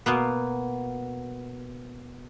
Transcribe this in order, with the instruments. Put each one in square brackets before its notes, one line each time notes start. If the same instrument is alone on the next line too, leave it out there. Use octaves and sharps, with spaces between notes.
[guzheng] B2 A#3 B3